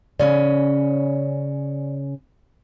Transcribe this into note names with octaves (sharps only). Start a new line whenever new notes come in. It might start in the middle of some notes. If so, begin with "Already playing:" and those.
C#3 C#4 D5